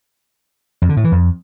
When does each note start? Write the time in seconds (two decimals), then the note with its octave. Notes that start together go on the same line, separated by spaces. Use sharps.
0.82 F2
0.89 D3
0.97 A2
1.04 E3
1.12 F2